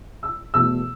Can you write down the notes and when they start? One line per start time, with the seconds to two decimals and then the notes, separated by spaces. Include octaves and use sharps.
0.23 E6
0.54 E2 B2 A3 E6